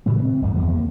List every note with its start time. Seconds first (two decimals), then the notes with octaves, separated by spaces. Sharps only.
0.06 A#2 C#3 E3 A3
0.18 A#3 C4
0.42 G1 D2 G#2
0.56 E2 F3
0.74 A#3